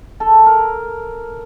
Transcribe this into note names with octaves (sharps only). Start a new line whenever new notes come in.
A4
A#4